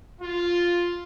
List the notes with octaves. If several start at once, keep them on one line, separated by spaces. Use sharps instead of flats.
F4